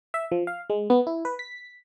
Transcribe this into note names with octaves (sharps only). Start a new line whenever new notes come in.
E5
F3
F5
G#3
B3
E4
B4
B6